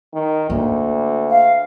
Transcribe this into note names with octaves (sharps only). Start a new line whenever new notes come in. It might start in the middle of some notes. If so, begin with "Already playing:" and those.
D#3
D2 A#3
F5